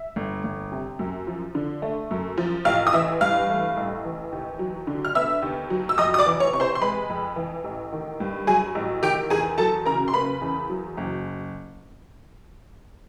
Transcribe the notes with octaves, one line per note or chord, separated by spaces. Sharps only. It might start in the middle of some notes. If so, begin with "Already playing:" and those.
Already playing: E5
G1
G1
C3
F#2
F3
D3
A3
F#2
F3
A1 F5 F6
D#6
E3 E5 E6
G2 F5 F6
A3
A1
E3
D#2
F#3
D3
F6
B3 E5 E6
D#2
F#3
E6
F2 D#5 D#6
D#6
D5 D6
E3
C#5 C#6
C3 C#6
C5 C6
C6
G#3 B4 B5
F2
E3
A1
D#3
G2
F#3 G#4 G#5
A1
D#3 G4 G5
E2 G#4 G#5
F#3 A4 A5
C#3 A#4 A#5
C6
A#3 B4 B5
E2
F#3
F#1